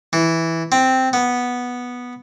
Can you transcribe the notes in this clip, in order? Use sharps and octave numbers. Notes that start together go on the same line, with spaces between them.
E3
C4
B3